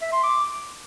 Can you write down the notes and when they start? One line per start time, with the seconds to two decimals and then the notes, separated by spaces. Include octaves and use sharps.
0.02 E5
0.13 C6
0.23 D6